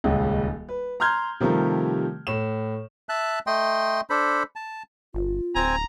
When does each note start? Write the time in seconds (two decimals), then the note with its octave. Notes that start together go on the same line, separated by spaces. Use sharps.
0.04 D#1 C#2 G#3 D#5
0.69 B4
1.00 A#5 C6 F6 G6 G#6
1.40 C3 D#3 F3 G3 A3 A#4
2.27 A2 E7
3.09 E5 A5 F#6
3.47 A3 D#5 G5 C6
4.10 D4 A4 C5 B5
4.56 A5
5.14 G1 F4
5.55 D1 C4 G#5 A#5